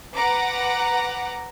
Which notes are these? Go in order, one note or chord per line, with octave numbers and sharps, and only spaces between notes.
B4 F#5 A#5 D6